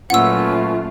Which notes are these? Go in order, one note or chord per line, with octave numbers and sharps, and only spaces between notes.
A#2 F#3 A3 C#4 F4 B4 F#5 E6